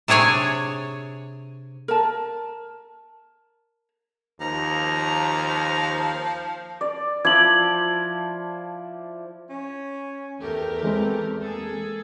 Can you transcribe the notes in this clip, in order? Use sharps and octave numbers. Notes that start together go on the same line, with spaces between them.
C3 D4 G#4 C#5 G#5
A#4 A5
D#2 F3 A#5
D5
F3 E4 D6 G#6 F#7
C#4
E2 A3 G4 A#4
E3 G#3 C4
A#3 G#4 A4